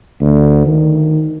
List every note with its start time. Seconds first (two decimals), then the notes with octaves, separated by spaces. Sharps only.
0.21 D2
0.66 D#3